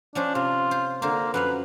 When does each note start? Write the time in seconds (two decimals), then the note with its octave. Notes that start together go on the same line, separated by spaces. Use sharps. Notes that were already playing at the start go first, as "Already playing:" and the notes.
0.15 F3 C#4 D4 C5
0.35 C3 F4
0.71 C5
1.02 D3 A#3 C5
1.34 F#2 F3 B4 F5